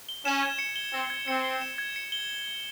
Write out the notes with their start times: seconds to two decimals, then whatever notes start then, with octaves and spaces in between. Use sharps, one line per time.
0.09 G7
0.25 C#4 E7
0.43 G#6
0.59 C#7
0.76 G7
0.93 C4 E7
1.10 G#6
1.27 C4 C#7
1.44 G7
1.61 E7
1.78 G#6
1.96 C#7
2.12 G7